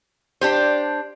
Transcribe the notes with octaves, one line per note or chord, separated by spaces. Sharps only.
D4 G4 C5